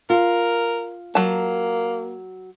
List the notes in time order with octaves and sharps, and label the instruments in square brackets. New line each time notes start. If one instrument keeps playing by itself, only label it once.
[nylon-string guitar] F4 [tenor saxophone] A#4
[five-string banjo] F#3 A5 [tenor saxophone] A#3